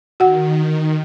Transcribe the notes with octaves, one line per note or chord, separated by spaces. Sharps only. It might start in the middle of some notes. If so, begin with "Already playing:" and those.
D#3 F#4 F#5